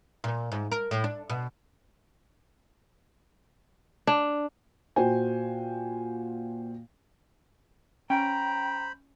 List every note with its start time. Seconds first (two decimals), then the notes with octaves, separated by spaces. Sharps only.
0.24 A#2
0.52 G#2
0.72 A#4
0.91 A2
1.04 D4
1.30 B2
4.07 D4
4.96 A#2 F#4 C5 G5 G#5
8.10 C#4 C5 G5 A#5 B5